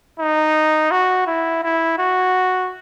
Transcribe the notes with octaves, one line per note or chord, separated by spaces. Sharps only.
D#4
F#4
E4
E4
F#4